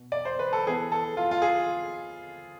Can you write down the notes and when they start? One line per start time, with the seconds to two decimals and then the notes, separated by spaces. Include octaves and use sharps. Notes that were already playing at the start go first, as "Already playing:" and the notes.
Already playing: B2
0.12 D5
0.25 C5
0.39 B4
0.53 A4
0.67 E3 B3 G#4
0.92 A4
1.17 F4
1.31 F4
1.42 G#4